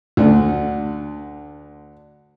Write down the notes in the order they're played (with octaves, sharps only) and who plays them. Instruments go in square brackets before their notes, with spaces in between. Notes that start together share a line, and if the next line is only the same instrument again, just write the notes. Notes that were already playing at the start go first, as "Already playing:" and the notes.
[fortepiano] D2 D3